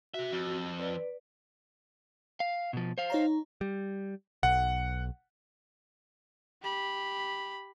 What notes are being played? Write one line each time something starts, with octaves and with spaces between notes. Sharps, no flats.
C3 F#4 E5
F2
B4 D5
F5
B2 F3
C5 F5
D#4 C#5 A#5
G3
B1 F#5
G4 B5